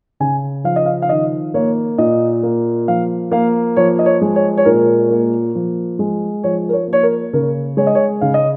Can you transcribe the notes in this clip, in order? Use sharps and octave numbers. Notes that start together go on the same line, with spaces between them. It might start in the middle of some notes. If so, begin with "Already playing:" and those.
C#3 G#5
F3 F5
D#5
F5
F5
D#3 D#5
A#3 C#5
A#2 D#5
A#3
F3 F5
A#3 F5
F3 C#5
D#5
C#5
G#3
C#5
C#5
A#2 A#4
A#3
F3
G#3
F3 C#5
A#4
C#5
A#3
C#5
A#4
C#3 A#4
G#3 C#5
D#5
C#5
C#3 F5
D#5